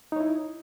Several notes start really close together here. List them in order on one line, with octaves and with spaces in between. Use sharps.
D#4 C#5 E4